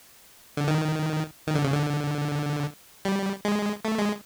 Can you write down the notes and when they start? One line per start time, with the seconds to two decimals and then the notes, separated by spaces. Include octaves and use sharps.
0.57 D3
0.68 D#3
1.47 D#3
1.55 D3
1.64 C#3
1.72 D3
3.05 G3
3.45 G#3
3.85 A3
3.98 G#3